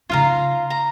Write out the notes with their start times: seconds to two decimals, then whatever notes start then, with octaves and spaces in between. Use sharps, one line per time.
0.10 C#3 D#4 F4 F5 A#5
0.70 A#5